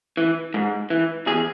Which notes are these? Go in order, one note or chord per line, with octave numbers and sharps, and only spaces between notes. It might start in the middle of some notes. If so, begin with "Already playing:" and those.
E3
G#2
E3
E2 G#4